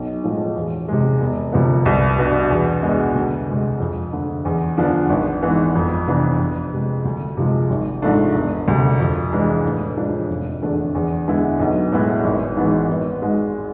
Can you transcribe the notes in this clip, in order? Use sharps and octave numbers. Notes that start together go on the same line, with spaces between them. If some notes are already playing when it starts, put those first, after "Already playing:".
Already playing: B1
A2 F3 G#3
E2
C3 G#3
E1
D2 C3 F3 B3
C2
B2 B3 D4
E2
B2 G#3 B3 D4
D2
C3 G#3
F2
D3 A3
E2
D3 F3 B3 D4
G#1
G#2 E3 B3
F2
C3 E3 B3 D4
F2
C3 G#3
D2
C3 F3 G#3
G#1
G#2 F3 A3 D4
E1
D2 C3
F2
E3 G#3 D4
A2
F3 G#3 D4
F1
E2 D3 A3 D4
E2
D3 G#3 B3 E4
B1
A2 G#3 B3 E4
G#1
G#2 E3 B3
G#1
G#2 G#3